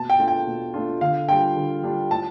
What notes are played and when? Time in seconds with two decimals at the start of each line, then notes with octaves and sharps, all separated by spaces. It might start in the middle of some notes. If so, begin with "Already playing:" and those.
Already playing: B2 A5
0.10 G5
0.19 A3 D4 F4
0.28 G5
0.47 B2
0.74 A3 D4 F4
1.01 D3 F5
1.29 G3 D4 F4 G5
1.56 D3
1.83 G3 D4 F4
2.11 A2 A5